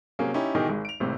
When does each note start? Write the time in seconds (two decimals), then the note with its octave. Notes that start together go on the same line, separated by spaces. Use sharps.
0.19 C3 F#3 A#3 C#4 G#4
0.34 C#4 D#4 E4 G4
0.55 B2 D#3 E3 D#4 G4 G#4
0.69 G#1 G#3
0.85 D7 F7
1.00 G#1 A2 C3